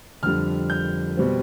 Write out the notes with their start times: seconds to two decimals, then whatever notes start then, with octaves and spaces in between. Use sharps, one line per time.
0.23 F2 D3 G3 F6
0.70 G6
1.17 B2 G3 C4